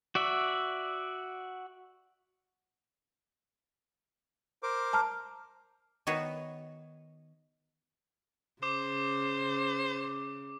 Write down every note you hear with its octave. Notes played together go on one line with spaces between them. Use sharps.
F#4 D5 E5
A#4 C5 D6
A5 A#5 F6
D#3 B3 F#4 B4 C#5
C#3 C5 D6